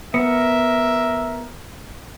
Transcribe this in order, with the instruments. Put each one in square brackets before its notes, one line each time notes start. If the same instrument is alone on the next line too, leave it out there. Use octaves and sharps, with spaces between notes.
[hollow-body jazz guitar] B3 [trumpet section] A#4 E5